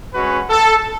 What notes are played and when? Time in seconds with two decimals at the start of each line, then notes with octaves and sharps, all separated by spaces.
0.14 G#3 C#4 F#4 B4
0.50 A4